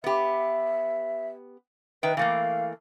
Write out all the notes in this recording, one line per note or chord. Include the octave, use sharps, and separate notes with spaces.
B3 G4 E5
D#3 B4 E5 G5
E3 A3 A#3 F5